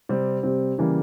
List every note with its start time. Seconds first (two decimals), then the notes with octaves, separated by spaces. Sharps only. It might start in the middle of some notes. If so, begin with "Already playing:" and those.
0.09 C3 G3 C4
0.43 C3 G3 C4
0.78 C#3 E3 G3 A#3